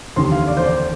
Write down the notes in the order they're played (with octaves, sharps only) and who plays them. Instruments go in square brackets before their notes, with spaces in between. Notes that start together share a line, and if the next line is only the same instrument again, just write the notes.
[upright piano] F1 D#2 D3 C6
F5
D5
C5
D5